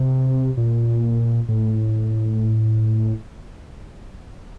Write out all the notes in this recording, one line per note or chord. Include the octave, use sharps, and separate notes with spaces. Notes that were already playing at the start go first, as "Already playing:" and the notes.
Already playing: C3
A#2
A2